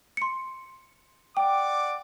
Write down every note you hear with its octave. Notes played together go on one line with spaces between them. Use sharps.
C6 C#7
D5 F#5 G5 D6